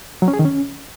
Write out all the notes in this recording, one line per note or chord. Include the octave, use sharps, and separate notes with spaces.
F#3
C#4
G#4
D#3
C#4